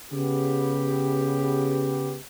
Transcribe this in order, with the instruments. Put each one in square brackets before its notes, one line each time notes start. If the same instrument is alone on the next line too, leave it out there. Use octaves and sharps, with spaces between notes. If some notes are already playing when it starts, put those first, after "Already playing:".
[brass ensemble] C#3 B3 G4